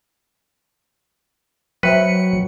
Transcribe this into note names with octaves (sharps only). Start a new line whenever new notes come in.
F#3 B4 C5 E5 G5 C#7